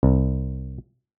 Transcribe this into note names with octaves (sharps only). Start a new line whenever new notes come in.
C2